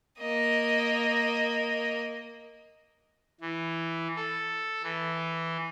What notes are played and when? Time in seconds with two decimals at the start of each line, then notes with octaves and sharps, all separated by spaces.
0.19 A#3 D#5
3.41 E3
4.16 A4
4.83 E3